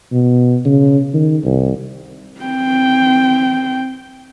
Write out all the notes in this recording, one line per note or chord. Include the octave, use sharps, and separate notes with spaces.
B2
C#3
D#3
C2
C4 G5